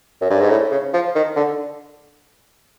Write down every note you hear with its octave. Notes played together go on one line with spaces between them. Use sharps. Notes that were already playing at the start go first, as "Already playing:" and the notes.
F#2
G2
G#2
A2
C#3
F3
D#3
D3